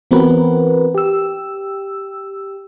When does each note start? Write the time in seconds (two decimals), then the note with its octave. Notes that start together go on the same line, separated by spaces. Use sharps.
0.11 E3 B3 C4 F#4 A#4 B4
0.95 G4 E6